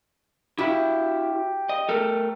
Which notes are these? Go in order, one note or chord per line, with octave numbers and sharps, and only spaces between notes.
E4 F#4 G4 E5
D#5
A3 A4 A#4